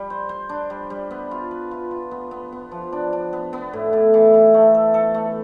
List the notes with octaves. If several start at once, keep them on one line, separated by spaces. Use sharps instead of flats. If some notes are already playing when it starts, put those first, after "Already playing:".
Already playing: G3
C5
C5
D4
G3
G3
B3
F4
B4
F4
F4
B3
B3
B3
F3
D4
D4
B3
B3
A2
A2
E3
E3
A3
A4
A4
A3